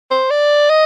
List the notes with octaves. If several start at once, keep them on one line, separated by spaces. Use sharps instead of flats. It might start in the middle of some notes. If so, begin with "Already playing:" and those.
C5
D5
D#5